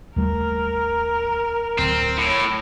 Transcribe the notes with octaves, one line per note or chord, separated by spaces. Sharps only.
D#2 G3 A3 A#4
D1 C4
A2 C#5